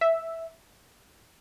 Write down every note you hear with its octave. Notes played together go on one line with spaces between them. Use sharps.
E5